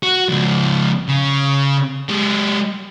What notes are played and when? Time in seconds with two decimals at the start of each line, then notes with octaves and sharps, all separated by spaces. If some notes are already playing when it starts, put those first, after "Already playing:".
0.03 F#4
0.29 C#2 F3
1.09 C#3
2.09 G#3 G4